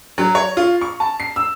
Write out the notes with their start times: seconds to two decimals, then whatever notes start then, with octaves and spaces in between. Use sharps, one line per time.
0.18 F#3
0.35 C#5
0.57 F4
0.81 C#6
1.00 A5
1.20 C7
1.36 E6